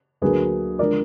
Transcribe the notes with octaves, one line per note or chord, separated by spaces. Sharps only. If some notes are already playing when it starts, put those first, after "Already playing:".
D2 D3 F#3 A#3 G#4 B4
D3 F3 G#3 A#4 D5